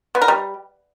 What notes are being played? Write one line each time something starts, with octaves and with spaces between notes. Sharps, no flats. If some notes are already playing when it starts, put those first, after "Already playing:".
B3
A#4
G3